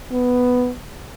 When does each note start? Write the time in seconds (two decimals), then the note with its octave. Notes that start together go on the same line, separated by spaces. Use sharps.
0.12 B3